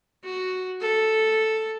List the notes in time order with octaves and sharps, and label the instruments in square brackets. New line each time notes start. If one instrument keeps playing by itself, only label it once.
[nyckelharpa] F#4
A4